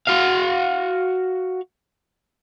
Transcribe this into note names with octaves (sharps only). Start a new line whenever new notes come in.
F#4 F5